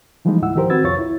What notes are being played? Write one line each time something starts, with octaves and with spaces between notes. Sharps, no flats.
E3 F3 G3 G#3 A#3 D#4
C#2 G#2 E4 F#5 E6
D#3 F3 G4 A#4 C5
C4 F#4 B4 E6 G#6 A6
C2 F2 F4 C#5 C#6 A6
E4